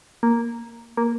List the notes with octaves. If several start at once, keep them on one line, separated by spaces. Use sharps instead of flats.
A#3
A#3